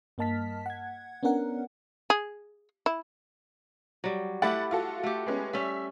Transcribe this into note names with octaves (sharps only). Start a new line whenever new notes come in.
G2 A#3 D#5 A5 F6 B6
F#5 G#6
B3 C#4 D4 A#4 F#5
G#4
E4
F#3 G3
A3 E4 G4 F#5 B5 A6
F4 F#4 A4
A3 G4
G#3 B3 C#4
G3 C#4 E5